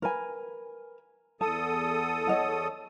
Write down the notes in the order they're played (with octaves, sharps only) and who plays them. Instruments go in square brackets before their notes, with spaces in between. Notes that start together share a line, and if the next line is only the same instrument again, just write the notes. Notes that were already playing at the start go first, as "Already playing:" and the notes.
[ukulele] A#4 B4 G#5
[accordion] E2 A4 D#6 [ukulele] A5
[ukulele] C#5 D#5 F#5